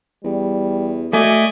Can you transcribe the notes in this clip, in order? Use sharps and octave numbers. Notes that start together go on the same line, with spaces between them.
E2 G3
A3 F#4 D5 D#5 G#5